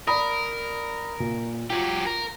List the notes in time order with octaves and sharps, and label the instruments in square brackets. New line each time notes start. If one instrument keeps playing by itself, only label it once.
[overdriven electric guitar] A#4 [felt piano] D5 B5 D#6
[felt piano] A#2
[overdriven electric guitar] F#3 G4 [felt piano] F4
[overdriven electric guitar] A#4